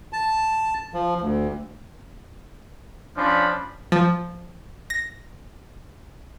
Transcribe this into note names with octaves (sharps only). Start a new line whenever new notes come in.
A5
F3
D2
F3 C#4 D4 B5
F3
A#6